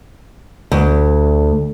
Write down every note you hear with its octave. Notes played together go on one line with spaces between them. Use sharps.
D2